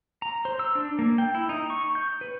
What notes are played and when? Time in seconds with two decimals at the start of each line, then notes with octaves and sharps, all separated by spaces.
0.22 A#5
0.45 C5
0.59 E6
0.75 D4
0.99 A#3
1.18 G5
1.35 E4
1.49 D#4
1.70 C#6
1.95 G6
2.21 B4